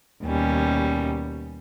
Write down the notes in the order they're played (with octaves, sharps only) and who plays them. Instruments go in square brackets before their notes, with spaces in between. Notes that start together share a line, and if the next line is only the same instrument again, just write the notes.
[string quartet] D#2 B2 G3 C#4